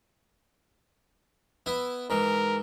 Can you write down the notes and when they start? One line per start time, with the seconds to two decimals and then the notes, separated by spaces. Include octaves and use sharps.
1.66 B3 E4
2.10 G#2 E3 A#4